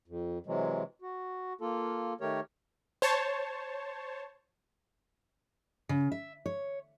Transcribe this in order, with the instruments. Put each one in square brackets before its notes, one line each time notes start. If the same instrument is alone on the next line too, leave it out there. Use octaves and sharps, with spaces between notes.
[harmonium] F2
C3 E3 F#3 G#3
F#4
A#3 F4 A4
D#3 A3 G4 A#4 C#5
[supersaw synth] C5 C#5 A5
[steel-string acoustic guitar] C#3
E5
C#5